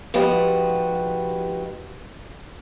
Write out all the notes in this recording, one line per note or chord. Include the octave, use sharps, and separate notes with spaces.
G#2 F3 F#4 G4 B4